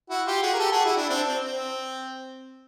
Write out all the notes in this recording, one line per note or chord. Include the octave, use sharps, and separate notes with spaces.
E4 F#4
F4 G4
F#4 G#4
A#4
G4 A4
F#4 G#4
E4 F#4
D4 E4
C4 D4
C4
C4